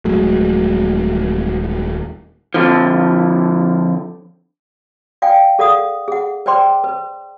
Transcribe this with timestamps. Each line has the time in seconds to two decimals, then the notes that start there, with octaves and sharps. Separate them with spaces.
0.05 D#1 F#3 G#3 A3
2.54 F2 D3 F3
5.22 D5 F5 G5 G#5
5.59 G#4 A4 D5 F5 F#5 D#6
6.08 G#4 F#5
6.46 B4 C5 D5 G5 C6 D6
6.84 B4